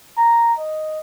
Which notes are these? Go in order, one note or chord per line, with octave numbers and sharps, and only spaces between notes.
A#5
D#5